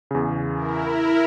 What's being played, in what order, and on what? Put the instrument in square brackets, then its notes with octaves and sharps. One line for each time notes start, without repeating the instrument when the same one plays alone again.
[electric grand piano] E2 C#3
[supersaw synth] E4 A#4